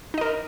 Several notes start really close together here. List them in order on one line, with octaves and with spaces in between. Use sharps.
D#4 D#5 A#4